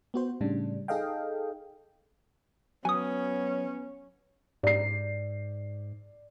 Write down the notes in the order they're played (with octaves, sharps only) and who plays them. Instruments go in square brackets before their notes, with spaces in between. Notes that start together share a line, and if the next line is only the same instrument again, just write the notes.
[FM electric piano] B3 F#4 C5
A2 C#3 G3 D4
D#4 G#4 A4 D#5 F5 G5
[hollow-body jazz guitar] F#3 [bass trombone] B3 [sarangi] C#4 [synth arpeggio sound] G#5 D#6
[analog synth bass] G#2 [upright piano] D5 C7